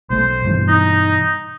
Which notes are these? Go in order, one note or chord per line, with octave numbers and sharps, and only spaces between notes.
B1 A3 C5
G2 B2 E3
D#4